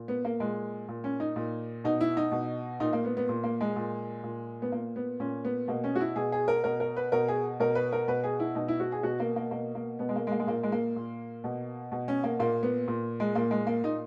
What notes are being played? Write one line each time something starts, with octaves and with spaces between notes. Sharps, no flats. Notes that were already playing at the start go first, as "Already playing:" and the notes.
Already playing: A#2
B3
A#3
A#2 G#3
A#2
C#4
D#4
A#2
B2 D#4
E4
D#4
B2
A#2 D#4
A#3
B3
B3
A#2
A#3
G#3
A#2
A#2
B3
A#2 A#3
B3
A#2 C#4
B3
B2 A#3
C#4
F#4
E4
B2 G#4
G#4
A#4
B2 A#4
A#4
B4
B2 A#4
G#4
B2 A#4
B4
A#4
B2 B4
G#4
E4
B2 D#4
E4
F#4
G#4
B2 F#4
A#3
A#3
B2 A#3
A#3
B2 B3
G#3
A#3
G#3
A#3
G#3
A#2 A#3
G#3
A#3
A#2
B2
B2
C#4
A#3
A#2 A#3
B3
A#2
G#3
A#2 A#3
G#3
A#3
A#2 D#4